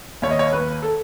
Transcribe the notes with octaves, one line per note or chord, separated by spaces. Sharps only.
D#2 C#5
D#5
C#5
D#2 B4
A4